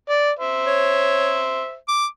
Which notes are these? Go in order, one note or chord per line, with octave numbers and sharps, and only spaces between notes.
D5
C5 E5
C#5
D6